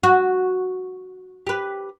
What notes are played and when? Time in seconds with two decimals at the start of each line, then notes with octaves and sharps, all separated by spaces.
0.03 F#4
1.47 G4 B4